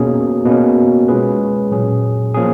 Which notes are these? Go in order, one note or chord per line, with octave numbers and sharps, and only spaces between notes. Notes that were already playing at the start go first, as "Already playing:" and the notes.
Already playing: B2 A#3 C#4 G#4
B2 A#3 C#4
G#3 C#4 F4 G#4 B4
A#2 F#3 C#4 G#4
F3 A#3 C#4 G#4